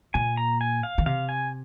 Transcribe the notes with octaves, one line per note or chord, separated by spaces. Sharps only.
A#2 G#5
A#5
G#5
F5
D#3
C3 F5
G#5